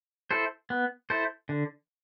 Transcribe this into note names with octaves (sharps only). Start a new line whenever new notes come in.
E4 A4 C5
B3
E4 A4 C5
D3